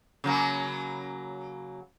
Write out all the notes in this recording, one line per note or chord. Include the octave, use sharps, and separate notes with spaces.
C#3 F#3 A#3